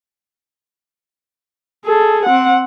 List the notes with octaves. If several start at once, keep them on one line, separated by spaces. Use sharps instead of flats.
G#4 A4
C4 F#5